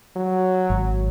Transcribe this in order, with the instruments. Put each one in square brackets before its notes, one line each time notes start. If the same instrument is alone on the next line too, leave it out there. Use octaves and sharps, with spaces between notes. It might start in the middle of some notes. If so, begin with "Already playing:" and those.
[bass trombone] F#3
[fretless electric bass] G#1